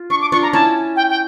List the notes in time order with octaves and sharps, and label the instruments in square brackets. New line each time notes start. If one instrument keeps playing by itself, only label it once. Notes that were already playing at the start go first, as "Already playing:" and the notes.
Already playing: [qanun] F4
[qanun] D4 [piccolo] C#6
[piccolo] D6
[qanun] D4 F4 [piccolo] C#6
[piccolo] A#5
[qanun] C#4 E4 [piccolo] A5
[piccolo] G5
G5